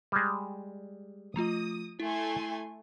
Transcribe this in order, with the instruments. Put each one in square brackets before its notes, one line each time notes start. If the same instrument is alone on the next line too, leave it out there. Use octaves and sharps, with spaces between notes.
[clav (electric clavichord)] G3 G#3
[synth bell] F3 A3 F4 [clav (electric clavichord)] D#5 A#5 [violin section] D#6
[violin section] A3 G#5 C6 [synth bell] E4